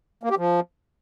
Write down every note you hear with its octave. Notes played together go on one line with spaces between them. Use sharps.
A#3
G4
F3